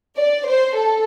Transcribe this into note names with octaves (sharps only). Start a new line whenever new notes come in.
D5
C5
A4